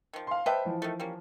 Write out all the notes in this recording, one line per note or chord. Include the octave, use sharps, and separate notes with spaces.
D#3 F3
F5 C6
B4 C5 D#5 E5 G5 A5
E3 F3
D#3 A3
G3 A#3 C#4